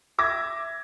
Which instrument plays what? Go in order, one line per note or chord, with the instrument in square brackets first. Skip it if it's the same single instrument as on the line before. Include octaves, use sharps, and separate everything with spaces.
[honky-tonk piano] E5 D6 G#6 A#6